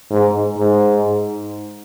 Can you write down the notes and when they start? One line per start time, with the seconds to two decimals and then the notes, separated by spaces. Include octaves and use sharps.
0.11 G#2
0.58 G#2